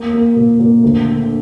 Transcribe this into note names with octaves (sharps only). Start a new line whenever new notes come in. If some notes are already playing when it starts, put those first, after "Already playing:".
Already playing: A#3
A#3
A#2
A#2
D2
D3